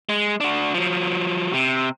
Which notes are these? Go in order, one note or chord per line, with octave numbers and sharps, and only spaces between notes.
G#3
D4 F#4
F3 F#3
C3